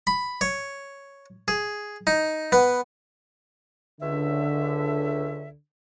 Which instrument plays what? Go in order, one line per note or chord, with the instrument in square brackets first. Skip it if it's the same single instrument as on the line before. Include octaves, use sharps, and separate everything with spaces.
[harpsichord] B5
C#5
G#4
D#4
B3
[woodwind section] C#2 E5 [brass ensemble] D3